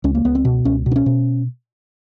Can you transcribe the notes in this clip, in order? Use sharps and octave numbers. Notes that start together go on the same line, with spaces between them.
C#2 C#4
A#3
C#2 B3
C4
B2
C#2 C#4
B2
D4
C#4
B2